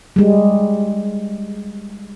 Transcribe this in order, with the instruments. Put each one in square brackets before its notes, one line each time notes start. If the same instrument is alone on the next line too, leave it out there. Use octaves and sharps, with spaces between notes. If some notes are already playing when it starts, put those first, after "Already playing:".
[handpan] G3 G#3